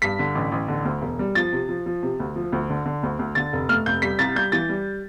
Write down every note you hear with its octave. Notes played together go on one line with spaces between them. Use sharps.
G2 B6
D3
A1
A1
D3
D2
E1
G3
F3 A6
C3
F3
F3
C3
D2
F3
D2
D3
D3
D2
D2
D3 A6
F1
A3 F6
F1 G6
G3 B6
C2 A6
G3 G6
E3 A6
G3